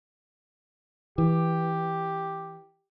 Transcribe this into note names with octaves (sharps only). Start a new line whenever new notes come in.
E3 G4